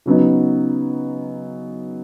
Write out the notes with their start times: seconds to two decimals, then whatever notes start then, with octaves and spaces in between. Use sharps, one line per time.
0.06 C#3 F#3 B3 D#4